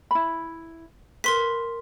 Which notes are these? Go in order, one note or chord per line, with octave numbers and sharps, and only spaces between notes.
E4 B5
A#4 B4 C6 B6